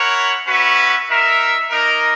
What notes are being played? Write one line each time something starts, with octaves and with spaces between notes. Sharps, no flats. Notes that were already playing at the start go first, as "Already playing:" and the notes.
Already playing: E4 A#4 C#5 F#5
C#4 F#4 B4 E5
D#4 A#4 E5
A#3 D#4 A#4